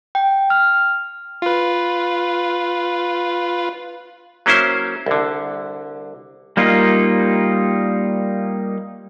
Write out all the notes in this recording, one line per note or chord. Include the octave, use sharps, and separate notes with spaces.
G5
F6
F4 B4
F#3 A#3 C#4 E4 C5
C2 D3
G3 A#3 D#4 F4